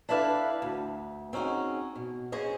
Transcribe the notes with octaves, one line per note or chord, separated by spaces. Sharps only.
D4 E4 A4 B4 D5 F5
D2
C4 C#4 D#4 F#4 G#4
B2
C#4 G#4 C5 D#5